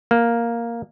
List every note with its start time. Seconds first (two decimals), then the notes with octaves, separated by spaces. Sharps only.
0.11 A#3